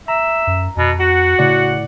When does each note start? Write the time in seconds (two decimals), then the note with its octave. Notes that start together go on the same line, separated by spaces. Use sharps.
0.08 E5 A#5
0.47 F#2
0.77 F2 B2
1.00 F#4 F#5
1.39 A2 C#3 D5